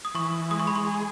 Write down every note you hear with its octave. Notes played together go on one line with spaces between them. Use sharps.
D#6
E3 C#6
G#3 D#6
C#6
B5
C#6
G#4